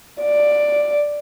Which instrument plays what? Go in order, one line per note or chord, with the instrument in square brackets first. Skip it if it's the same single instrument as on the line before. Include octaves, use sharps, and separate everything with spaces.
[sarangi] D5